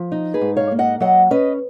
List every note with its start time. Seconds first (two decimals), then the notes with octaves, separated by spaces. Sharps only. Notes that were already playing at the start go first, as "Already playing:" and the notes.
Already playing: F3
0.12 D#4
0.34 G#4 B4
0.41 G#2
0.57 C#5 F5
0.71 A#3
0.79 D#5 F#5
1.00 F#3 D#5 F#5
1.31 C#4 B4 D#5